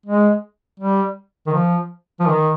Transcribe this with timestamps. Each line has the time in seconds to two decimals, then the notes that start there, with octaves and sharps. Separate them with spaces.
0.06 G#3
0.80 G3
1.47 D#3
1.53 F3
2.20 F3
2.27 D#3